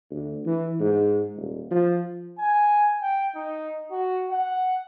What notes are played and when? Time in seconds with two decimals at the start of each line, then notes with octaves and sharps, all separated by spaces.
0.11 D2
0.46 E3
0.80 G#2
1.36 D#1
1.71 F3
2.39 G#5
3.02 G5
3.35 D#4
3.92 F#4
4.31 F#5